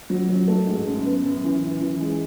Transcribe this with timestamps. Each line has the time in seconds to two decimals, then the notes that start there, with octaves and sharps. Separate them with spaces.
0.10 F#3
0.29 F#3
0.47 A3
0.67 G#2
0.86 F#2
1.05 B3
1.24 F#2
1.44 E3
1.62 F#2
1.81 E3
2.00 G#3